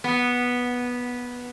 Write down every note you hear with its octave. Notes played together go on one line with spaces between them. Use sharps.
B3